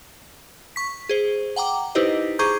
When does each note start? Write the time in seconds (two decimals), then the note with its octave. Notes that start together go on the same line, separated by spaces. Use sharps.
0.76 C#6 B6
1.09 G#4 C5
1.56 F#5 G5 A#5 D6
1.95 D#4 E4 G4 B4 C5 D#5
2.39 G#4 C5 A#5 C#6 D6 G6